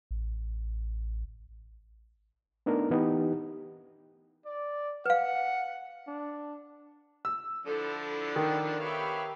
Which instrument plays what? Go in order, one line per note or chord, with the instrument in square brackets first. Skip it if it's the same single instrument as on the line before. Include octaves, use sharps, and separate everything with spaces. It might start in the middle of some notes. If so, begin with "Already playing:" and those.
[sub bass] A1
[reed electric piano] A3 B3 D4 D#4 A#4
E3 B3 D#4 G4
[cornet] D5
[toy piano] B4 F5 [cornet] F#5
[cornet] D4
[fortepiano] E6
[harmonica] D3 F3 D4 [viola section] E4 A4
[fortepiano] D#3
[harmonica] B3 C#5 F5 [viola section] G4 E5 B5